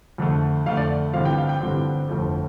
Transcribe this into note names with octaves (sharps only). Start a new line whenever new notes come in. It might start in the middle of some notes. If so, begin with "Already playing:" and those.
F2 D3 A3
F2 D3 A3 F5
D5
A1 G2 D3 F3 C4 F5
G5
F5
G5
A1 G2 D3 F3 C4
G1 F2 F3 A3